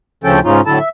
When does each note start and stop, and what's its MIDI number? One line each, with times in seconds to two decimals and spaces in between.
0.24 0.40 38
0.24 0.40 49
0.24 0.40 53
0.24 0.40 61
0.24 0.40 69
0.24 0.40 79
0.44 0.61 44
0.44 0.61 49
0.44 0.61 61
0.44 0.61 63
0.44 0.61 65
0.66 0.79 45
0.66 0.79 50
0.66 0.79 54
0.66 0.79 64
0.66 0.79 69
0.66 0.79 81
0.79 0.89 76